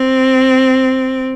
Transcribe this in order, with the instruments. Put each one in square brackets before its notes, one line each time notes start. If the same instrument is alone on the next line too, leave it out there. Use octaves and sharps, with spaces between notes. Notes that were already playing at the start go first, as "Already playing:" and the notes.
Already playing: [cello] C4